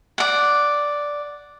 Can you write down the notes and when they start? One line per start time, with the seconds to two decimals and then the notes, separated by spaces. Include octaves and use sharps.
0.18 D5 F#5